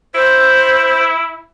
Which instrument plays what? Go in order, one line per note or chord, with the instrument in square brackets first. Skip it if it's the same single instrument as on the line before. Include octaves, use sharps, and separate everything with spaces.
[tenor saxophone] E4 [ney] C5